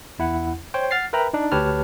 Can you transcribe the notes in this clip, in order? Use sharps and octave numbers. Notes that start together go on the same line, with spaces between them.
E2 E4 F#5
C5 C#5 G5
F#5 F6 A6 C7
A#4 B4 E5 G5 A#5 B5
D4 D#4
D2 G4 B4 C#5 A5 F6